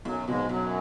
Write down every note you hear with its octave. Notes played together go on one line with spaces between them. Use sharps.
B1 F#2 F#3
G#2 B2 F#3 G#3
B1 F#2 F#3